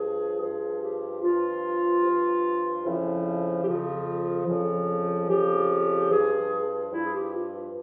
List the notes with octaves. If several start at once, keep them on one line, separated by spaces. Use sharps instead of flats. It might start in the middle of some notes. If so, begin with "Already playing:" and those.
Already playing: G2 F3 G#4
G2 F3 G#4
G4
G2 F3 F4
G2 F3
F2 C#3 F3 E4
G4
F2 C#3 F3 F4
F2 C#3 F3
F2 C#3 F3 G4
G2 F3 G#4
G2 F3 E4
G#4
G4
F4